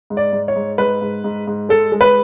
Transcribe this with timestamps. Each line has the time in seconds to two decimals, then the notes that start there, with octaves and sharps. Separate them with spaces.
0.10 G#2
0.17 D5
0.33 G#2
0.48 C#5
0.56 G#2
0.78 G#2 B4
1.02 G#2
1.24 G#2
1.47 G#2
1.69 G#3 A4
1.92 G#3
2.01 B4